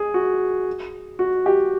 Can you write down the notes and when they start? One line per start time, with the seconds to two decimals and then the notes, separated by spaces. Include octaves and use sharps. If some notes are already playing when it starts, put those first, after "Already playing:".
Already playing: G#4
0.14 F#4
1.19 F#4
1.46 G4